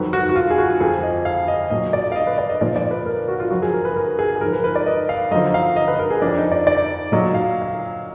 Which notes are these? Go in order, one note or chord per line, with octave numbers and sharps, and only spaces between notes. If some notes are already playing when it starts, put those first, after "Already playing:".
Already playing: F2 D#3 F#3 B4
F#4
F#4
F4
G#4
F#4
F2 F3 G#4
D#5
F5
D#5
A#2 F#3 D#5
D5
F5
D#5
B4
D5
D#5
A#2 F3 D5
D5
B4
A#4
F#4
F4
F#2 F3 F#4
G#4
A#4
B4
A#4
G#4
G#4
G#2 F3 A#4
B4
B4
D5
D#5
F5
F#2 D3 F3 D#5
F5
D#5
B4
A#4
G#4
F2 F3 D4
D#4
D5
D5
A#2 F#3 D#5
F5
F5